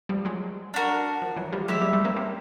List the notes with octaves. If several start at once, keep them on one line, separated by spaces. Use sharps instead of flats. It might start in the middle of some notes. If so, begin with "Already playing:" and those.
F3 G3
F#3 G#3
D4 F#4 A#4
F3
E3 F#3
F3 G3
F#3 G#3 E4 G4 C5 E5
G3 A3
G3 A3
A#3 C4
A#3 C4